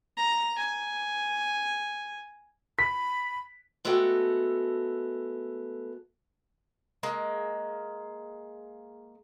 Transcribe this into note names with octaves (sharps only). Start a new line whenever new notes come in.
A#5
G#5
B5 B6
G#3 A3 B3 F#4 A4 G5
G#3 A#3